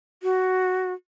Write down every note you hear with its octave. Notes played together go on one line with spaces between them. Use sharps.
F#4